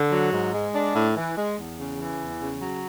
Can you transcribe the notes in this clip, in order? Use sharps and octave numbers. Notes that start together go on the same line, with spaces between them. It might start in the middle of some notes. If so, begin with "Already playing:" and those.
Already playing: D3
F#3
G#2
G#3
D4
A2
E3
G#3
E2
C#3
E3
E2
C#3
F#3